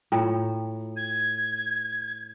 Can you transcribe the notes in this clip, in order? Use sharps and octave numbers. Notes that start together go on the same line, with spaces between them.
A2 F4 G5 A#5
G#6